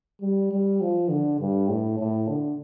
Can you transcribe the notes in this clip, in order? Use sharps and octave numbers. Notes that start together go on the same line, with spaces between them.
G3
G3
F3
D3
G2
A2
A2
D3